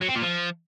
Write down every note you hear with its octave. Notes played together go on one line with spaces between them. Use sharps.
F#3
C4
A#2
F3